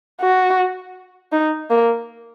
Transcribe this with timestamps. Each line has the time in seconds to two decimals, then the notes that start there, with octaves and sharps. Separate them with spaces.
0.21 F#4
1.32 D#4
1.70 A#3